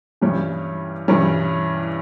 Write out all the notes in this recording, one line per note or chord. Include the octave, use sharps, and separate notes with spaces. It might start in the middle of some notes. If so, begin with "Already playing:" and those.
G2 E3 G3 C#4
G2 E3 G3 C#4